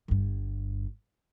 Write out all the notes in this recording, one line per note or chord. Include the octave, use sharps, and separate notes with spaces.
G1 G2